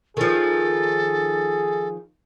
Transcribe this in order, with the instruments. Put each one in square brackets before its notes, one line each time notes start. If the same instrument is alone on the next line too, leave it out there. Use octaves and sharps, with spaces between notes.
[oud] D#3 F3 [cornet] G#4 [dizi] A4